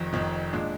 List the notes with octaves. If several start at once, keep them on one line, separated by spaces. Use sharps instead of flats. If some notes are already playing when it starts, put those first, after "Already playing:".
Already playing: F1 F2 D#3
F1 F2 D#3
A#2 G#3 D4